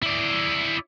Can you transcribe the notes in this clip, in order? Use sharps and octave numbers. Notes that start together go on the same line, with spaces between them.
E4 D5